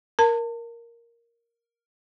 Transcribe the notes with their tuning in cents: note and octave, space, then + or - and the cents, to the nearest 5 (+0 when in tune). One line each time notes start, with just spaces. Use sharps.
A#4 +0 A5 +40